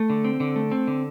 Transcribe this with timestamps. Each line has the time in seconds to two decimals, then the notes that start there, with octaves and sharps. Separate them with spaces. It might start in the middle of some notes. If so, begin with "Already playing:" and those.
Already playing: A3
0.10 D3
0.25 C4
0.40 D3
0.56 A3
0.72 C4
0.87 D3